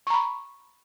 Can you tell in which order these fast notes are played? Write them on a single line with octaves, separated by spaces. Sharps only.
C#6 A#5 B5